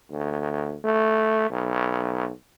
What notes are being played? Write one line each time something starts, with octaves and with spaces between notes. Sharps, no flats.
D2
A3
B1